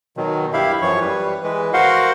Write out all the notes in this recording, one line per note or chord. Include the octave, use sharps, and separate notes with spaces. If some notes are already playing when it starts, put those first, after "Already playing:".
B2 D#3 F#3
G2 E4 G4 E5 F5 B5
F#2 E3 F3 C#5 C#6
G3 B4
E3 G#3 B4
F#4 A#4 C5 F5 F#5 C6